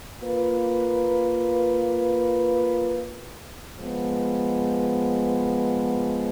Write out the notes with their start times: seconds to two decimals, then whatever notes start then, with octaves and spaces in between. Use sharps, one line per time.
0.23 A#3 F4 B4
3.80 F3 G#3 B3